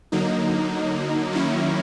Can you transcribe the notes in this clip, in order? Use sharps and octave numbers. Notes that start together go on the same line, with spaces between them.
D3 F#3 A#3 D#4
D#3 F#3 A#3 C#4 E4